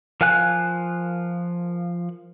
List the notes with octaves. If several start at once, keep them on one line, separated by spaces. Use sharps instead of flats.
F3 A#4 F5 G#5 F#6